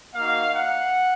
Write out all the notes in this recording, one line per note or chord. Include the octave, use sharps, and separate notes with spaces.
A#3 D#4 F#4 F5
F#5